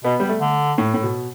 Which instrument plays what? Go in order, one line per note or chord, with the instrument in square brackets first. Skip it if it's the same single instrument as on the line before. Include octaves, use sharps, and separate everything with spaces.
[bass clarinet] B2 [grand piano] B3
[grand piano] G3
A3
[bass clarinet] D3
[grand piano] A2
A2
B2